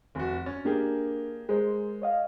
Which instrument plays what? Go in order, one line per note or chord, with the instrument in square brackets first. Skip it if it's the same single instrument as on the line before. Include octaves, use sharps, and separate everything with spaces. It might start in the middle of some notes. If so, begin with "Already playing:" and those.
[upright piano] F1 F#4
[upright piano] C#4 [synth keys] A6
[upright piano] A#3 G4 G#4 [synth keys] D4 A#4
[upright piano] G#3 [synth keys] G#4 A#4 C5
[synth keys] C#5 D#5 F5